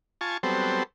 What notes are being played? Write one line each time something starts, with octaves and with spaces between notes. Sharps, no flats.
F4 G#5 A5 C#6
F#3 G3 B3 C4 A4 C5